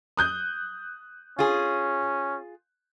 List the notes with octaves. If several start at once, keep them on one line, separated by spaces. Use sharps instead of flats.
D#6 F#6 G6
C#4 F4 G#4